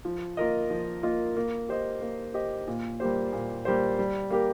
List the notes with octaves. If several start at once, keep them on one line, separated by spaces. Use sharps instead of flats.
F3
A#3 F4 A#4 D#5
F3
A#3 F4 A#4 D#5
A#3
G4 C5 D#5
A#3
G4 C5 D#5
A#2
G3 A#3 G4 C5
A#2
G3 A#3 G4 C5
G3
A#3 G4 A#4